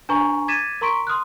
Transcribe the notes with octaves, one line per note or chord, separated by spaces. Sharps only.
D4 B4 G#5 A#5 C#6
D6 G#6 A6 B6 D#7 E7
A#4 A#5 C6 C#6 B6 D7
C6 D#6 F6 F#6